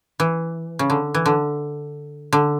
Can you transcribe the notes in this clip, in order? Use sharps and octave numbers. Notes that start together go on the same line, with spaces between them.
E3
C#3
D3
E3
D3
D3